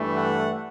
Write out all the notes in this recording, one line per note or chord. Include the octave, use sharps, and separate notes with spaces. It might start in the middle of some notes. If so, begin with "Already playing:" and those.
Already playing: G2 E3 A3
F#5